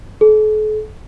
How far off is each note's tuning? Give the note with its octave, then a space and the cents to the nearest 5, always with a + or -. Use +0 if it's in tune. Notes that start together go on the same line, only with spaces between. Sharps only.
A4 -45